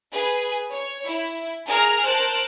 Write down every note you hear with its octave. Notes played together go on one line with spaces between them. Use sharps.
G#4 B4
C#5
E4
G#4 A#4 A#5 F6
A#4 C5 A5 F#6 D7